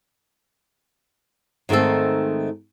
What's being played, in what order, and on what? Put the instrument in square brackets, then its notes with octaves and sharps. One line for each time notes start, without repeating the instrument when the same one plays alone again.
[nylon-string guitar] G#2 D#3 A3 C4 A4